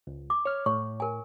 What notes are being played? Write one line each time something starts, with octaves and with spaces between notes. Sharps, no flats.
C#2
D6
C#5 F6
A2 C#5 C#6
A#4 G#5